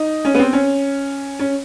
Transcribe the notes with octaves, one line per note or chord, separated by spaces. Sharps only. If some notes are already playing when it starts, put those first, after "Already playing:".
Already playing: D#4
C#4
B3
C4
C#4
C#4